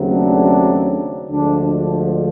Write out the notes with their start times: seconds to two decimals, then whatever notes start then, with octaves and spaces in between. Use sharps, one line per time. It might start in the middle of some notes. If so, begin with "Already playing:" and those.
Already playing: D#2 C#3 F#3 A3 C4
0.11 D4
1.30 D2 D3 F3 G#3 D4
1.70 D4